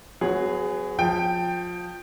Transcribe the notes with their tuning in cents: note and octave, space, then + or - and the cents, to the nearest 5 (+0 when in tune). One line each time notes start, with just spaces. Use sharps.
F#3 +0 B3 +40 G#4 +0
F3 +20 G5 +5